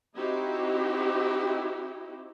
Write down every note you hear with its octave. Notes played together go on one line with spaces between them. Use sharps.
C4 D#4 E4 F#4 G4